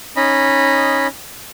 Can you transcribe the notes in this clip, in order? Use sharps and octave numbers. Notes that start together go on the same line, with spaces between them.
C#4 D#4 D#5 B5